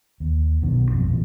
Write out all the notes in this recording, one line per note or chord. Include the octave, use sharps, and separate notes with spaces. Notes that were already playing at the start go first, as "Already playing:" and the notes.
D#2
B1 F#2 B2 D#3
A#1 F2 B2 C4
A#2 E3